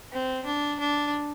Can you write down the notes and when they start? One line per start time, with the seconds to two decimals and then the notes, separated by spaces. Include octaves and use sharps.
0.12 C4
0.46 D4
0.80 D4